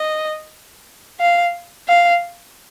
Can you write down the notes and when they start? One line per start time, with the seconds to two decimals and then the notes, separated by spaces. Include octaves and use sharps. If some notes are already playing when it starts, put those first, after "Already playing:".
Already playing: D#5
1.21 F5
1.88 F5